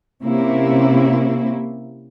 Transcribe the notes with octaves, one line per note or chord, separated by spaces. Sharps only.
C3 A#3 C#4 E4